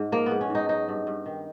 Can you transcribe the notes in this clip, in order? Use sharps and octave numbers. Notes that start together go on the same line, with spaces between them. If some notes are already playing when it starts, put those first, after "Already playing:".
Already playing: G#2
F3 A#3
G#2 B3
C#4
G#2 D#4
F#3 D#4
G2
G2
D#3